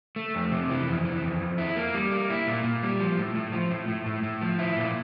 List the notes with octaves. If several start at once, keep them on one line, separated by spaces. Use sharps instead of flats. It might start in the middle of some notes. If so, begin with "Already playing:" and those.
A3
F2
C3
E3
F2
E3
F2
F2
E4
A#3
G3
A#3
E4
A#2
A#2
G3
F3
A2
A2
F3
A2
A2
A2
A2
F3
E4
A#2